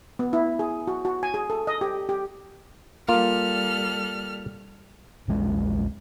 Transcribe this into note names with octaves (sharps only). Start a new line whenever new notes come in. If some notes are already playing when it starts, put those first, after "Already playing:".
B3
E4
G#4
F#4
F#4
G#5
G#4
A4
D#5
G4
G4
G3 A#3 F4 A4 F6
A#1 E2 G#3 C#4